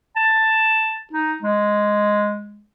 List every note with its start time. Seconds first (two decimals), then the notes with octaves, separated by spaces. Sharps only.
0.16 A5
1.13 D#4
1.42 G#3